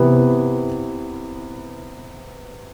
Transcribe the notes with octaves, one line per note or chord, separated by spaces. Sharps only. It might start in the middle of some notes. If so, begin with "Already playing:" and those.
Already playing: C3 E3 B3